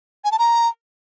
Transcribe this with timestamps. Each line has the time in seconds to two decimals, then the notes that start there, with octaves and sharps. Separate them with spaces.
0.24 G#5
0.32 A5
0.39 A#5